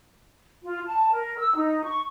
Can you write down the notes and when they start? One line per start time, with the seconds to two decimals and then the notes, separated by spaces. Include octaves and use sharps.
0.63 F4
0.86 A5
1.12 A#4
1.38 E6
1.56 D#4
1.84 C#6